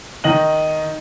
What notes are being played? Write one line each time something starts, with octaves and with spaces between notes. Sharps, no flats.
D#3 D#5 F#7